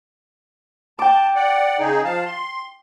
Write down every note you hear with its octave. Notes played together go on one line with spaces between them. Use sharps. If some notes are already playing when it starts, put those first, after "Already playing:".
G5 A5 D6
D5 F#5
C#3 D#4 G#4
F3 F5 A5
C6